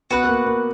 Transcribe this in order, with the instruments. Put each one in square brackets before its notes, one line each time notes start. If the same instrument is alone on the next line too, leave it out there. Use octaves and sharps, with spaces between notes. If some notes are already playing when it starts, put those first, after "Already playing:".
[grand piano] B3 [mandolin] F#4 B4 F#5
[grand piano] B3
A#3
A#3